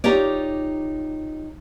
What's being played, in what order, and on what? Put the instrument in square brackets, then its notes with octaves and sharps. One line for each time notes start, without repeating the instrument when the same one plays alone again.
[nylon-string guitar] D#4 F4 G4 C#5 D5